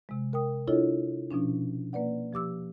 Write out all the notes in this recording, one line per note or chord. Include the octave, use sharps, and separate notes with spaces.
C3 G#3
A#4 G5 D#6
D4 E4 F4 A4 C#5 D#5
B2 F3 C#4 D4
A#3 B4 D5 F#5
F3 G4 D6 E6